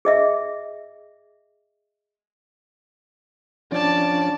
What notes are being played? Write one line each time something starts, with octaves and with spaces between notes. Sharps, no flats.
G#4 D#5 E5
F3 C#4 D4 D5 A5